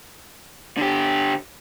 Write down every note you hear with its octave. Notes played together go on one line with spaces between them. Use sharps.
D3 G4